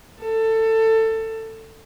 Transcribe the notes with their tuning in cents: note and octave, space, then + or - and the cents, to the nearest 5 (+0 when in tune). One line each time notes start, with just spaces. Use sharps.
A4 +20